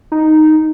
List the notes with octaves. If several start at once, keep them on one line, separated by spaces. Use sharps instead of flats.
D#4